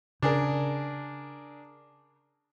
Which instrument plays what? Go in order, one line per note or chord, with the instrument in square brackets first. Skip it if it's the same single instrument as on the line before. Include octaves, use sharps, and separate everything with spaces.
[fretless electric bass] C#3 [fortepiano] D4 G#4 A#4